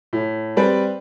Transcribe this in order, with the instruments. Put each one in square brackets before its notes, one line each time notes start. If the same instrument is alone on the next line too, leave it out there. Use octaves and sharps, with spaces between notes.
[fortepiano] A2
G3 C4 B4 D5